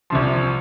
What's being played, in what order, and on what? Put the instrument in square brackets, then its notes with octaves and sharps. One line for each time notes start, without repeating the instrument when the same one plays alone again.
[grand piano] C2 C3 F3 C6